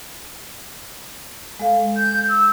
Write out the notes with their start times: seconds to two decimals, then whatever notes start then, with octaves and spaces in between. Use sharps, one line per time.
1.59 G#3 A4 F5
1.96 G6
2.29 E6